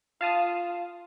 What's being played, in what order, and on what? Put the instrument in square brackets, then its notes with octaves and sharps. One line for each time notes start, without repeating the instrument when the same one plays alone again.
[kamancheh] F4 [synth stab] F5 A5 D#6